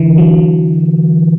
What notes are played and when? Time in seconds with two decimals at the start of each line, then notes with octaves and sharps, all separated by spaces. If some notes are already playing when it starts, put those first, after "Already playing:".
Already playing: D3 E3
0.18 F#3